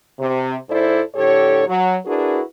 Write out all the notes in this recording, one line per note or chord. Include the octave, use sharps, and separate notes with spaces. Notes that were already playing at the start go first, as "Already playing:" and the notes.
C3
G#2 E4 A4 C5 D5
A2 D3 G4 A4 C#5
F#3
D4 E4 F#4 G#4 A#4 B4